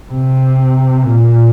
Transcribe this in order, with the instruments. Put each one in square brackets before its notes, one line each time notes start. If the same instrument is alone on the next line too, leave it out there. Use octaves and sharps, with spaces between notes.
[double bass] C3
A#2